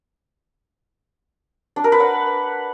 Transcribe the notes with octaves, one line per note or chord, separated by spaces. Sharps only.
D4
A#4
B4
F#5